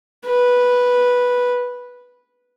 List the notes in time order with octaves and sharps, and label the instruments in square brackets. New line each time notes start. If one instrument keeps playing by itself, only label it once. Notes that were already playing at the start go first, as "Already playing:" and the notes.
[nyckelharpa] B4